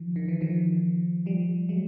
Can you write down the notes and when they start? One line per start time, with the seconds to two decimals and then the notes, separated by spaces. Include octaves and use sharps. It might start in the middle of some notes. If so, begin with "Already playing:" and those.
Already playing: D#3 F3
0.16 D#3
0.28 E3
0.41 D#3 F3
1.26 F3 G3
1.69 F#3 G#3